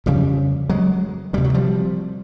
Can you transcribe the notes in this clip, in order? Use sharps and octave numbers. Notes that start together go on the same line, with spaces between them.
F2 C#3 F3 G3
F#3 G#3
D2 C3 G3
F#3
F3 G3